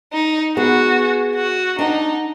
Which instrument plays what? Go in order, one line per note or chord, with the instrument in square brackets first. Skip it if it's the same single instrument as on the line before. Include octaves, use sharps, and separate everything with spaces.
[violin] D#4
[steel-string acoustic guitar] B3 G#4 [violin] F#4
[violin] F#4
[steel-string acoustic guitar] D4 F#5 [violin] D#4